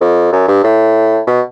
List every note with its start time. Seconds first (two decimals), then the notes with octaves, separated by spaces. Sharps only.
0.01 F2
0.32 F#2
0.48 G2
0.64 A2
1.27 B2